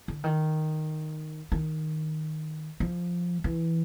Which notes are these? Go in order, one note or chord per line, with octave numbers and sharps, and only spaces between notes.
D3
D#3
D#3
F3
E3